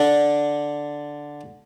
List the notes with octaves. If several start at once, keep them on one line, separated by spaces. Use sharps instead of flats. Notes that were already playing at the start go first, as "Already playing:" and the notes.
Already playing: D3 D4